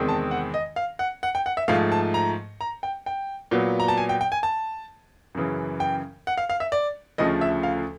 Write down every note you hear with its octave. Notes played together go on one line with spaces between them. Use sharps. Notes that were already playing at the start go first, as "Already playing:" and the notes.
Already playing: E2 C3 D#3 G#3 C4
A5
F#5
D#5
F5
F#5
F#5
G5
F#5
E5
G#2 F3 A3 F5
A5
A#5
A#5
G5
G5
A#2 F#3 B3
A#5
A5
G#5
G5
G5
G#5
A5
F#2 C#3 E3
G5
F#5
F5
F5
E5
D5
D2 C#3 F3 A3 D#5
E5
F5